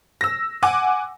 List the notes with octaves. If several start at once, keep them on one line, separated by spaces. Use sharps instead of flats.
E6 A#6
F#5 G#5 D6